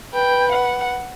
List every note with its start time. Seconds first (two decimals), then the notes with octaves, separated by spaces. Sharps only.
0.14 B4 G5
0.52 F#5